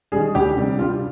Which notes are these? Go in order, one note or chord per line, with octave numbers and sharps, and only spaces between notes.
D#3 G3 G#4
D2 G4
C3 G3
G2 F4